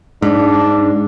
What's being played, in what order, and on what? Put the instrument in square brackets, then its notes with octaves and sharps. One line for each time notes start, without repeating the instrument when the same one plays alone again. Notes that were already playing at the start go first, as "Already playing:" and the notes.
[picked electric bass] G#2 [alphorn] D4